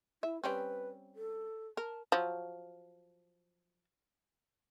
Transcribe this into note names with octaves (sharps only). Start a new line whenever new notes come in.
E4 E5
G3 C4 C#4 B4
A4
A#4 A5
F3 F#3